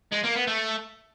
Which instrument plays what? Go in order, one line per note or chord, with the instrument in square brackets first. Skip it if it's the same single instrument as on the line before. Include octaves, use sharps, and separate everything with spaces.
[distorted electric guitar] G#3
A#3
B3
A3